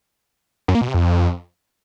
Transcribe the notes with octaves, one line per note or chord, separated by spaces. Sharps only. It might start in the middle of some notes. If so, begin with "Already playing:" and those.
F#2
A#3
B2
C3
F2